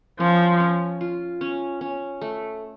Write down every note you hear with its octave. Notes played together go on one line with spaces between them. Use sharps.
F3 C#4
C#4
F4
C#4
C#4
A3